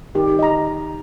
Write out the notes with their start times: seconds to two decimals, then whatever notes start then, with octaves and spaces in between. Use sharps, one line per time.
0.15 D#3 G4
0.39 D#5 A#5